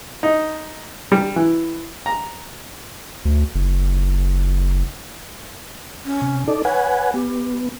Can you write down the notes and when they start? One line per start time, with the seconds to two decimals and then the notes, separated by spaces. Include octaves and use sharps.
0.23 D#4
1.12 G3
1.36 E3
2.06 A#5
3.25 D2
3.55 F#1
6.05 C#4
6.22 C3
6.47 D#4 A4 D5
6.65 B4 C#5 F#5 G#5
7.14 B3 G4